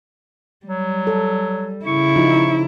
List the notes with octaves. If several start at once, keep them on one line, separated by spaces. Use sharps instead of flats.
F#3 G3
A4
C#3 E4 C#6
F3 D#4 F4